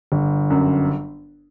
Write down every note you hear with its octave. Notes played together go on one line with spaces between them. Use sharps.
G1
F#2